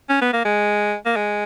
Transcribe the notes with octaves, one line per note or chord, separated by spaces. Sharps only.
C#4
B3
A#3
G#3
A#3
G#3